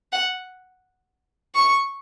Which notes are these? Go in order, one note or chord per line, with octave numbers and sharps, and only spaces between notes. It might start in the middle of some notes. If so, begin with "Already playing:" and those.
F#5
C#6